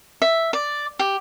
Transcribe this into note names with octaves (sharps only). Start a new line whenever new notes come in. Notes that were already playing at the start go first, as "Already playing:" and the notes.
E5
D5
G4